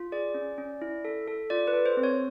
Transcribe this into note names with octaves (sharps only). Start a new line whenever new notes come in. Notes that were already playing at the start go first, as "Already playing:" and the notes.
Already playing: F4
G#4 D5
C#4
C#4
E4
A4
A4
F4 D5
B4
A4
C5
C4
C#5